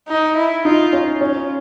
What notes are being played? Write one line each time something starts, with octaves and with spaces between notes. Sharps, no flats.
D#4
E4
D#4 F4
C#4
C#4 F4